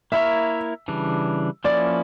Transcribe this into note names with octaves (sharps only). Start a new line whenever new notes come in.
A#3 E4 A#4 C#5 E5
C#3 E3 G3 D4
F3 A#3 C#4 E4 D5